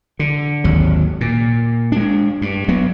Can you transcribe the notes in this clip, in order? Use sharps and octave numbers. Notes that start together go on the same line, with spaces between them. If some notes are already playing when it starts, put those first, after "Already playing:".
D3
G#1 D#2 F#3
A#2
G#3 D4
G2
F#3 B3